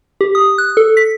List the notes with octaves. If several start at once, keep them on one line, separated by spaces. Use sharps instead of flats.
G4
D#6
F#6
A4
B6